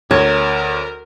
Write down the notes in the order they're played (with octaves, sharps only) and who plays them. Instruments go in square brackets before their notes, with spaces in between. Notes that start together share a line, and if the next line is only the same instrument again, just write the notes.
[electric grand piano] D2 [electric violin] A#4 [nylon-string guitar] C#5